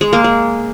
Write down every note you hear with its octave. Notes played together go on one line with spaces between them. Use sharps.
G#3
A#3
G#3